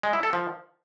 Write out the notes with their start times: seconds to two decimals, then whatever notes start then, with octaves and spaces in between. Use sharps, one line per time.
0.03 G#3
0.13 E4
0.23 A4
0.33 F3